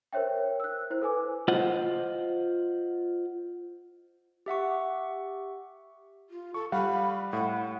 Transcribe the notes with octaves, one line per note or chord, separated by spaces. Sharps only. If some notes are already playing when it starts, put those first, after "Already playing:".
A#4 C5 C#5 E5 G5
E6 F#6
E4 C5
A4 B4 G#5 D6
F4 C5 D#5 F#5
G4 E5 F#5 C#6
F4
A4 C#6
G3 F5 F#5 B5
A2 F#5